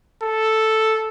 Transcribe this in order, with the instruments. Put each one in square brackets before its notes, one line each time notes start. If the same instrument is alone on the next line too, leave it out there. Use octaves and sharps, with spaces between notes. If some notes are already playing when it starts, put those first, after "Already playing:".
[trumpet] A4